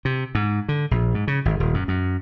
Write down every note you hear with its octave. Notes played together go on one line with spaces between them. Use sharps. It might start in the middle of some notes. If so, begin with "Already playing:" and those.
C3
G#2
D3
A#1
G#2
C#3
G#1
D#1
F#2
F#2